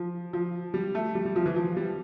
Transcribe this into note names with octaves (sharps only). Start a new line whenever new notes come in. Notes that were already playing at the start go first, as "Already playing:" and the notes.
Already playing: F3
F3
G3
A3
G3
G3
F3
E3
F3
G3